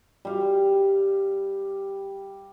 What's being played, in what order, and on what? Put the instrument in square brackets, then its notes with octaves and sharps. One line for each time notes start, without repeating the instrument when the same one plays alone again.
[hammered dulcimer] G3 F5